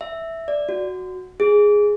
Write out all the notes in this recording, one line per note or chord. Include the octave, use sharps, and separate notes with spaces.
E5
D5
F#4
G#4